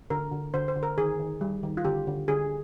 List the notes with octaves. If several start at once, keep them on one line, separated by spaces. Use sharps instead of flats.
D3 A#4
D3
D3 C5
C5
D3
A#4
D#3 G#4
D#3
G3
D#3
F4
D3 G4
D3
D3 G#4